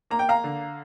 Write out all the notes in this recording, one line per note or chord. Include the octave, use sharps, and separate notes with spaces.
A#3 A#5
G5
F5 A#5
D3